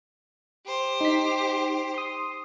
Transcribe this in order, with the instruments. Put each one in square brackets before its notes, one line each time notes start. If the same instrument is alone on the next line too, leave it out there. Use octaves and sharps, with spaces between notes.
[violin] G4 C5
[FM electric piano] D#4 B6
C6 D#6